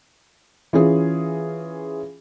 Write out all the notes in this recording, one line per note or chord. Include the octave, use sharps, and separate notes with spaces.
E3 C#4 F4 G#4